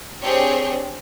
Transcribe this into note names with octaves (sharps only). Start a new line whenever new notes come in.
C4 D4 G4 G#4 C5 C#5